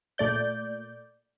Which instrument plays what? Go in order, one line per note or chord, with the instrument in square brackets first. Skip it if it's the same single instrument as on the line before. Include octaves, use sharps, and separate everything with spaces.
[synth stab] A#2 A3 D5 G6